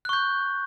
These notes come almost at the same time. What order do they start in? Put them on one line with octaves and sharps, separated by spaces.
F#6 C#6 G6